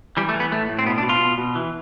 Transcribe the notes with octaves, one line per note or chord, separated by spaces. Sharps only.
E3 G3
A3
E3
B3
A2 A3
A2
C4
B2 B3
D4
B2
F4
B2
B2
E3